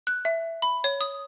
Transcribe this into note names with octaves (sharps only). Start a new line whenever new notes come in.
F#6
E5
B5
C#5
D#6